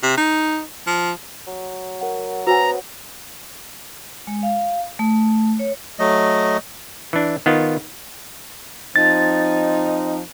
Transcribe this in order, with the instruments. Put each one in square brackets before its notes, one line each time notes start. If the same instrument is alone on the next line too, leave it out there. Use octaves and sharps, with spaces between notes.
[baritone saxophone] C3
D#4
F3
[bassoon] F#3
[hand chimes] A#4 F#5
[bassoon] B3 [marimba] F#4 G#5 [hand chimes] C5 C#5 F#5 [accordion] A#5
[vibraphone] G#3
F5
A3
C#5
[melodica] F#3 A3 D#5
[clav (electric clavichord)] E3 D4
D#3 B3 F4
[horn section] F3 C4 D#4 [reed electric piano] A6